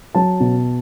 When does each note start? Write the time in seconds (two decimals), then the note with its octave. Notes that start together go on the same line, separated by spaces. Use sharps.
0.15 F#3 A5
0.40 B2